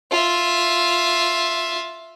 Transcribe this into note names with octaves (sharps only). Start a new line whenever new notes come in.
F4 E5